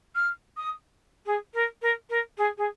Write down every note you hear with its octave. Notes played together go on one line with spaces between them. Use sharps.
F6
D#6
G#4
A#4
A#4
A#4
G#4
G#4